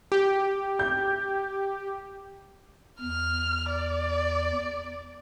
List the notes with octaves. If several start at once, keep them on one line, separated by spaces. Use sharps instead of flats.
G4
G6
E2 F6
D5